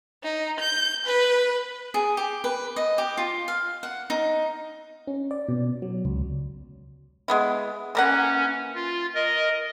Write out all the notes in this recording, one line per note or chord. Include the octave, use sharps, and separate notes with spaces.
D#4
G6
B4
G#4
G4
B4
D#5
G4
F4
F5
F#5
D#4
C#4
D5
B2
F#3
C#2
G#3 B3 E4
E3 A#3 C#4 F#5
F4
A#4 D#5